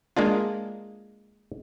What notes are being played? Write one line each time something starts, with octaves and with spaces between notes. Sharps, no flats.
G#3 A#3 D4 F4